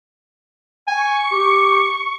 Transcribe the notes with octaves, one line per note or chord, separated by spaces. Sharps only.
G#5 C#6
G4